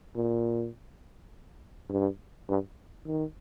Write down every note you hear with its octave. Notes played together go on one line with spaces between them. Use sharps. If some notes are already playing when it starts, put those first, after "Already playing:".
A#2
G2
G2
D#3